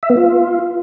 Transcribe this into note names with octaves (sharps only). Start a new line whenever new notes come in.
E5
B3
F4